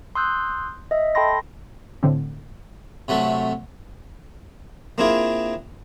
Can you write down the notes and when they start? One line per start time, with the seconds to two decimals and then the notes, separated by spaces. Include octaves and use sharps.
0.15 C6 D#6 E6 F#6 G6
0.91 D#5 E5
1.15 A4 G5 A5 B5 C6 A#6
2.03 A2 D3 C4
3.08 C3 F#3 A3
4.98 A#3 C4 D4 E4 F4 G#4